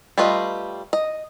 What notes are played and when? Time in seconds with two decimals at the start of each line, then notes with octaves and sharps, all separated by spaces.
0.18 G3 A3 F4 B4 D#5
0.93 D#5